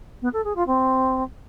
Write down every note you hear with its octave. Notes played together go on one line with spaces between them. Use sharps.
B3
A4
G#4
F4
C4